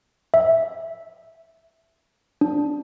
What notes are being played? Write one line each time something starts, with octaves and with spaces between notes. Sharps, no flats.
E5
D4